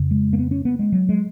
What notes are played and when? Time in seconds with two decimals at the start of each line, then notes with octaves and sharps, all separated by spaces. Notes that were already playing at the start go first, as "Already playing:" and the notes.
Already playing: F2 C#3
0.11 G#3
0.33 A#3
0.39 B3
0.51 C#4
0.65 B3
0.79 G#3
0.92 F#3
1.09 G#3